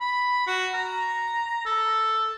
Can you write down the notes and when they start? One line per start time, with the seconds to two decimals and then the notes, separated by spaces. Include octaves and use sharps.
0.01 B5
0.47 F#4
0.74 A#5
1.66 A4